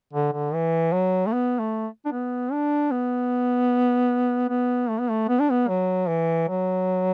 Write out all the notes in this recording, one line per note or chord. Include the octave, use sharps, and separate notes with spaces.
D3
D3
E3
F#3
A3
B3
A3
D4
B3
D4
B3
B3
A3
B3
A3
B3
D4
B3
F#3
E3
F#3